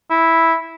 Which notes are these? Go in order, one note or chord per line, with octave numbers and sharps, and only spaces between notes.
E4